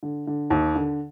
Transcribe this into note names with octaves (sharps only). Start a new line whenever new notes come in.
D3
D3
D#2
D3